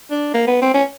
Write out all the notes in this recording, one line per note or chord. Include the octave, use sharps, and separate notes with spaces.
D4
A#3
B3
C4
C#4